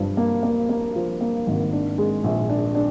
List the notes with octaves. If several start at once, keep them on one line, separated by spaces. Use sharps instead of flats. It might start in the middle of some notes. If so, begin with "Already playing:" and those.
Already playing: G2 F3
A#3
A#3
A#3
F3
A#3
G#1
D4
G#3
A#1
D4
D4